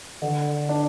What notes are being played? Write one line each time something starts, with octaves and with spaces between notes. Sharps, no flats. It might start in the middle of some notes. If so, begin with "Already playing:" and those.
D3
D4